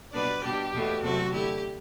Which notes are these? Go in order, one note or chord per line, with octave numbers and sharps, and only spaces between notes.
B2 G3 B3 D4 B4 D5
B2 G3 D4 G4
E2 B2 A3 E4
E2 C3 F#3 A3 C4 F#4 A4
D3 A3 E4 G4